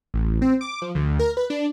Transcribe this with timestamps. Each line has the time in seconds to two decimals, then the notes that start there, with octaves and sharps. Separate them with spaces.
0.14 A1
0.42 C4
0.61 D6
0.82 F3
0.95 D2
1.19 A#4
1.37 B4
1.50 D4